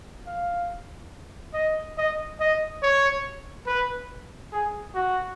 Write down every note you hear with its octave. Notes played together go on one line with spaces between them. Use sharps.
F5
D#5
D#5
D#5
C#5
B4
G#4
F#4